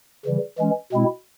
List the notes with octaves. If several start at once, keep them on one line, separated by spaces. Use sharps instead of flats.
C#3 E3 G3
E3 G#3 C#4
B2 G#3 C4 E4